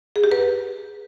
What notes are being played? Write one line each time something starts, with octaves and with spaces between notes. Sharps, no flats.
G#4
G4
B4